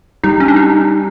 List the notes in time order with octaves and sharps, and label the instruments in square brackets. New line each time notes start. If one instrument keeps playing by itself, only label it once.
[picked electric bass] G3 [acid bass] D#4
[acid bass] C#4
D4
D#4